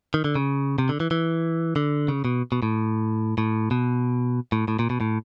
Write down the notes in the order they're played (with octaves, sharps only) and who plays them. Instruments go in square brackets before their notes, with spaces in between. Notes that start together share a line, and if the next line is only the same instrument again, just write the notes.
[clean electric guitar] D#3
D3
C#3
C3
D3
E3
E3
D3
C#3
B2
B2
A2
A2
B2
A2
A2
A#2
B2
A2